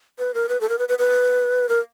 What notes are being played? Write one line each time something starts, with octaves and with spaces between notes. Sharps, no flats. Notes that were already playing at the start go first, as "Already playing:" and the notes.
B4
A#4
B4
A4
A#4
B4
B4
B4
A#4